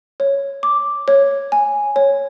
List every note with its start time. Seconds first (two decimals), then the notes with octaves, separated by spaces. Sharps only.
0.20 C#5
0.63 D6
1.08 C#5
1.52 G#5
1.96 C#5